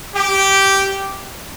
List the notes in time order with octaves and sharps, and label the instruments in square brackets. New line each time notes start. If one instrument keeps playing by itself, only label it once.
[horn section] G4